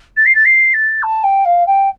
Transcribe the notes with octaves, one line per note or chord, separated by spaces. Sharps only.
A6
C7
A6
C7
A6
A5
G5
F5
G5